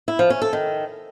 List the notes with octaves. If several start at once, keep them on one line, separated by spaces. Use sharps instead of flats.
E4
F3
C#4
A4
D#3